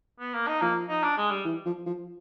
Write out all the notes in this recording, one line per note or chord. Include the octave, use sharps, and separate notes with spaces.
B3
A#3
D#4
F3 A#3
D#4
D4
G#3
G3
E3
F3
F3